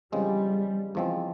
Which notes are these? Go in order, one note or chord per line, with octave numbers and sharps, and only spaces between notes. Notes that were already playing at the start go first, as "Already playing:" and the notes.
E2 C#3 F3 G3 G#3 C4
E2 C#3 F3 G#3 C4